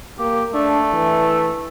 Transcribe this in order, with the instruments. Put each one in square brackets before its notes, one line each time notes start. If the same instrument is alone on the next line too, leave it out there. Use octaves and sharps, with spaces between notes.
[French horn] A#3 [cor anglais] G4
[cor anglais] A3 [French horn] D4
[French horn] E3